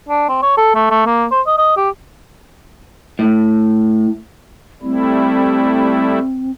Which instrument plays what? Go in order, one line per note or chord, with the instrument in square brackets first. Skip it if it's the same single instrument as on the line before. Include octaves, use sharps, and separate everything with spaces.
[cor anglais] D4
C4
C#5
A4
A3
A3
A#3
C5
D#5
D#5
G4
[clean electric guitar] A2
[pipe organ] G3 A3 E4 [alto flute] C4